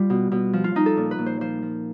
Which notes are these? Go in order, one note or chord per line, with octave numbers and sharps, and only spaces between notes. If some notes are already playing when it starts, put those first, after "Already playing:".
Already playing: G3 F4
B2
B2
F3
F4
F3 D#4
A4
A#2
B4
A#2
C5
F3 C5
F3